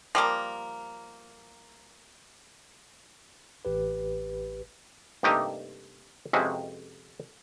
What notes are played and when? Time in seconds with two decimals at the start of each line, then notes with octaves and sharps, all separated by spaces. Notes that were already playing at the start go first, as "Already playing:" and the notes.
0.15 F3 G3 A#3
3.65 A1 G4 B4
5.23 G2 C3 A3 A#3 D#4 G4
6.33 F2 C3 G#3 C#4 F#4 B4